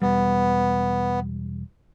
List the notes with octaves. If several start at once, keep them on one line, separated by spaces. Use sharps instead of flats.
E1 G3 B3